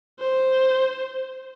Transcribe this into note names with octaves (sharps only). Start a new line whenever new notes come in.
C5